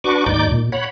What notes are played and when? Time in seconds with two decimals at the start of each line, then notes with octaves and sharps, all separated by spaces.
0.04 D4 F#4 B4 C#6 D6
0.26 D#2 G#2 D#4 D5 D6 G6
0.50 A#2
0.72 C#5 F#5 B5